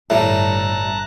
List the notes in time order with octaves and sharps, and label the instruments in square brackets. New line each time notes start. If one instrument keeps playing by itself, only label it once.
[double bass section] G1 [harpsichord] A2 G3 [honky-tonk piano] E4 A4 [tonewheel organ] A5 A#5 F#6